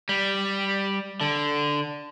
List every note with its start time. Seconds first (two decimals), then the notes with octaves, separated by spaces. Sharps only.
0.09 G3
1.21 D3